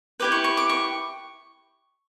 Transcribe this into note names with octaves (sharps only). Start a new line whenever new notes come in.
E4 G4 B4 D6
C#6
C#6
D6
C#6